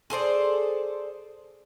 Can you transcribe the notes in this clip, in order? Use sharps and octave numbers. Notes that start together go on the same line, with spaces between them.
G#4 A4 C5 D5